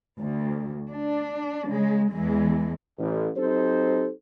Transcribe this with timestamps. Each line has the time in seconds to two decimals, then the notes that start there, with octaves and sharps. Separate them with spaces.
0.20 D2
0.91 D4
1.68 C#3 G#3
2.11 E2 E3 G#3
2.99 A1
3.37 F#3 C4 D#4 G4 A4 C5